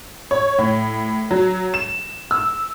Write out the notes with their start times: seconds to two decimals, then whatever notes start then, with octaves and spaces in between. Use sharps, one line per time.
0.31 C#5
0.59 A2
1.31 F#3
1.74 E7
2.31 E6